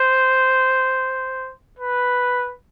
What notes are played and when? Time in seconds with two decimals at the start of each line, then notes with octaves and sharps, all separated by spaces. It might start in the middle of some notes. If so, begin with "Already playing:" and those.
Already playing: C5
1.79 B4